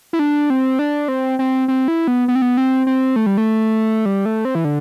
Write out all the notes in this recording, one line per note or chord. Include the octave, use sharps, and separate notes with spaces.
E4
D4
C4
D4
C4
C4
C4
E4
B3
B3
C4
B3
C4
C4
A3
G3
A3
G3
A3
C4
E3
D3